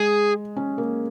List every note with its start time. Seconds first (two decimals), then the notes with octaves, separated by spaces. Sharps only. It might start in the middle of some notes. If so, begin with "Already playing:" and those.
Already playing: G#3 G#4
0.56 C#4
0.78 A#3